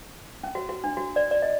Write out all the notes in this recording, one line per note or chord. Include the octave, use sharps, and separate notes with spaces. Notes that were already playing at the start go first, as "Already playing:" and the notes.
C#4
F#4
F#4
D4
F#4
D5
D5
D#5